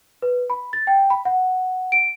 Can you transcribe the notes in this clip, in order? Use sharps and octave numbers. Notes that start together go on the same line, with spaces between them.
B4
B5
A6
G5
B5
F#5
D7